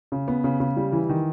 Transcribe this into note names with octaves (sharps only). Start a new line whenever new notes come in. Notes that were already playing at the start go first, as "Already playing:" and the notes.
C#3
B3
C#3
C#3
G3
E3
D#3